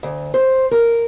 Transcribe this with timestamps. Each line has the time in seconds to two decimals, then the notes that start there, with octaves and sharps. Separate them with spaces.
0.03 D2
0.34 C5
0.71 A#4